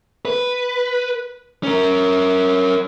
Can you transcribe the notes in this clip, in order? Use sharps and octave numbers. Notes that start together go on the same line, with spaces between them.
B4
C#4 A#4